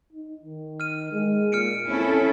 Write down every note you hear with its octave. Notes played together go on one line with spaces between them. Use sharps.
D#4
D#3
F6 D#7
G#3
A#2 F6 C#7 D7
C4 C#4 E4 A4